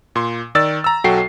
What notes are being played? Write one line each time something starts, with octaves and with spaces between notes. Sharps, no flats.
A#2 C6
D#3 D5 E6 A6
A#5 E6
B1 F#3 F#4 A4 G5 C7